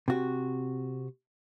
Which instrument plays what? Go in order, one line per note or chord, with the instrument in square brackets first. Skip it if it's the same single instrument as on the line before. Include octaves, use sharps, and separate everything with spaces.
[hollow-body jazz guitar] C3 F#4